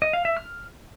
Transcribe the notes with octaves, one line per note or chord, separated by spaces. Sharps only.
D#5
F5
E5
F6